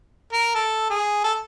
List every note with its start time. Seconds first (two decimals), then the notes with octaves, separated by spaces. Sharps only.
0.33 A#4
0.55 A4
0.90 G#4
1.24 A4